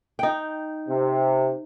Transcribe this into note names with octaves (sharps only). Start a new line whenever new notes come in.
D#4 G5
C3